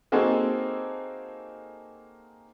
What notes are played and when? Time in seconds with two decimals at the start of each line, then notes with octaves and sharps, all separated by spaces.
0.12 A#3 C4 D#4 F#4 G#4 A4